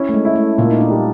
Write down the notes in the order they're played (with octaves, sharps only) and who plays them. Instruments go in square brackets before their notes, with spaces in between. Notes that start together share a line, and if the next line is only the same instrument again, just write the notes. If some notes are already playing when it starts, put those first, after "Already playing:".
Already playing: [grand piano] C#4 E4
[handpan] A3
G#3
[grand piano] E4
[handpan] A3
[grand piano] A#2 [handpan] A#3
[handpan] D#4
D4
[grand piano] G3